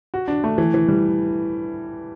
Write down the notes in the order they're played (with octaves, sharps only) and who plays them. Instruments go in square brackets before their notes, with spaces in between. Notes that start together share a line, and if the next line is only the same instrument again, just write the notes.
[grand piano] F#4
D4
A3
E3
E3
G3